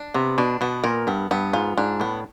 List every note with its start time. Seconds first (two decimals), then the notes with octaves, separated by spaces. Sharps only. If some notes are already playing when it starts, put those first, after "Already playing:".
Already playing: D4
0.14 C3 B3
0.38 B2 D4
0.61 B2 B3
0.84 A#2 A#4
1.07 G2 B3
1.31 G2 B3
1.53 G#2 F4
1.78 G#2 D4
2.00 A2 B3